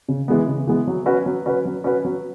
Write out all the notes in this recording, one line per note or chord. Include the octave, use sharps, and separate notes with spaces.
C#3
E3 G#3 B3
C#3
E3 G#3 B3
F#3
C#4 F#4 B4
F#3
C#4 F#4 B4
F#3
C#4 F#4 B4
F#3